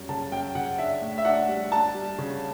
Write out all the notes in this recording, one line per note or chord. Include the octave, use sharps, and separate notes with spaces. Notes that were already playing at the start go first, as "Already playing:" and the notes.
Already playing: F#2 G3
C#3 A5
F#2 G5
C#3 F#5
D4 E5
A2
E5
D4 F#5
G3
D4 A5
G3
C#3